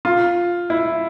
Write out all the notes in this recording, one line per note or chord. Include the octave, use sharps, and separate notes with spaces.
F4
E4